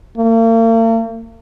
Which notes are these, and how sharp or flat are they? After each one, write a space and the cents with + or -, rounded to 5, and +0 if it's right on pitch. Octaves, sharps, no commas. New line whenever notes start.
A#3 -45